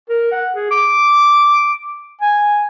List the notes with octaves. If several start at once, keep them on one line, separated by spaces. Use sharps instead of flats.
A#4
F#5
G#4
D6
G#5